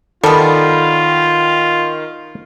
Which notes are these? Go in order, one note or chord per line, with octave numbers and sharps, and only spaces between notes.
D#3 G3 B3 F4 A4